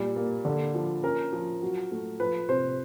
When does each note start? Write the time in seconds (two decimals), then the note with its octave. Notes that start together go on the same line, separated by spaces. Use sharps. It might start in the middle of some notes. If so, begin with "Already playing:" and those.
Already playing: A#2 G3
0.16 A#3
0.45 D3
0.75 F3
1.04 C#4 A#4
1.33 F3
1.62 F#3
1.91 A3
2.20 F3 B4
2.49 C3 C5